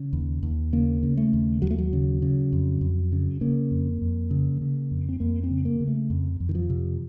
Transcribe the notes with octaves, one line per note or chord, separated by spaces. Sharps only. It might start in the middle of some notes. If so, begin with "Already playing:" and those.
Already playing: C#3
D#2
D#2
C#3 A#3
C#3
A3
D#2
D#2 F#3
A3
F#3
C#3
C#3
F2
F2
C#3
C#3 A#3
F2
F2
C#3
C#3
F2
C4
F2 A#3
C4
C#3
A#3
C#3
A3
F2
F2
D#3
F3
C3